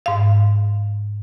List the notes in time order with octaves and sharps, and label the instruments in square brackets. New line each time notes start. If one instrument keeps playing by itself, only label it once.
[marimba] G#2 F5